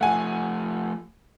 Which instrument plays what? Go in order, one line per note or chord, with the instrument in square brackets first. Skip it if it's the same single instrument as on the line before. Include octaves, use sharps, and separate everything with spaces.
[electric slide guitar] F3 A3 [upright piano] F#5 G#5